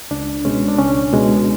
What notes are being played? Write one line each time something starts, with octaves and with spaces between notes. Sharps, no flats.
C#2 D4
B2 G#3 C#4
D4
C#2 C#4
B2 G#3